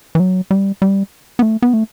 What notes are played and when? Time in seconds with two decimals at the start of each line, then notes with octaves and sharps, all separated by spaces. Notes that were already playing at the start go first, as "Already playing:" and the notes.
0.15 E3
0.20 F#3
0.51 G3
0.82 G3
1.39 B3
1.43 A3
1.62 B3
1.74 A3